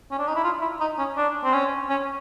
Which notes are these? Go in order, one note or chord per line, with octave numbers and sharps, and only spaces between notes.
C#4
D4
D#4
E4
F4
E4
D#4
C#4
D4
C4
C#4
C#4